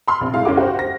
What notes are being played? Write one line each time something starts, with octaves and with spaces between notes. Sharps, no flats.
B5 C6 F6
A#1 C3
C2 G#2 E4 F5
F#1 C#4 F#4 D6
F#4 G4 C5
A#6